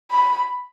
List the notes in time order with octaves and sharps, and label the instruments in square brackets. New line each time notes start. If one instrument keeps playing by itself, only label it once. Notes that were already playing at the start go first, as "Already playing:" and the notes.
[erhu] B5